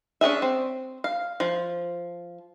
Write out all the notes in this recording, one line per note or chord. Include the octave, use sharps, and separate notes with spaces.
C#4 D4 G#4 E5
C4
F5
F3